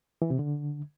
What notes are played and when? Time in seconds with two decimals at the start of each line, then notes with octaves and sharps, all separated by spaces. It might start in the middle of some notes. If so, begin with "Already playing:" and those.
0.22 E3
0.30 C3
0.39 D3